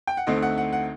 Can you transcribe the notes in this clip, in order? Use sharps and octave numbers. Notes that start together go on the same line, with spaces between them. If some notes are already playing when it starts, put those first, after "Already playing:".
G5
F#5
D2 D3 A3 C4 D#4 D#5
F#5
F#5
F#5